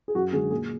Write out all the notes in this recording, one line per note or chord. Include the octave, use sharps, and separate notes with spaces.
G#4
F#2 F#4
D3 G#3 G#4
A#2 G#4